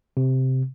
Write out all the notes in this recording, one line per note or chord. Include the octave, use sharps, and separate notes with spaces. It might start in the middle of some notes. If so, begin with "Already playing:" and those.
C3